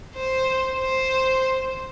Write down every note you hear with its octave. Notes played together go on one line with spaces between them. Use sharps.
C5
C5